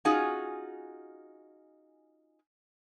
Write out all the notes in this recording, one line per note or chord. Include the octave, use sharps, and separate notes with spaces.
C#4 D#4 F4 F#4 G#4 G#5